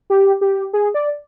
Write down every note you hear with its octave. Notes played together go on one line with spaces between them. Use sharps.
G4
G4
G#4
D5